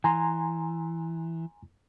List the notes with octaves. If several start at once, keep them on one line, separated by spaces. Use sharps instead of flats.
E3 G#5 A#5 C6